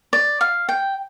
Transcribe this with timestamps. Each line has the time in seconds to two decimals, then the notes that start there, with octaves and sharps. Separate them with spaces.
0.13 D5
0.41 F5
0.69 G5